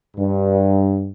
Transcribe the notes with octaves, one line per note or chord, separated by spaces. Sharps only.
G2